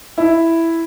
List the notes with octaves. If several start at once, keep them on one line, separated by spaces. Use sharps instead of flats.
E4